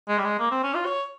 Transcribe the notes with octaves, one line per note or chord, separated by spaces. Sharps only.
G#3
G3
G#3
A#3
C4
C#4
F4
C#5